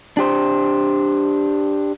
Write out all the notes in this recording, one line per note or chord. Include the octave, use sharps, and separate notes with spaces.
D4 G4 C5